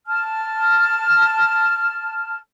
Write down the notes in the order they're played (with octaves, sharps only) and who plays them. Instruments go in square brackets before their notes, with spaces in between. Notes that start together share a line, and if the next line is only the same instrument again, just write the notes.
[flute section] A5 F6